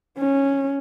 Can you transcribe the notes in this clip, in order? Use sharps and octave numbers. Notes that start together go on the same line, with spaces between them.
C#4